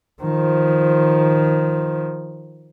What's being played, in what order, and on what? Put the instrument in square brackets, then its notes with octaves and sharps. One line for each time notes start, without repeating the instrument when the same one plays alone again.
[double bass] D#3 F3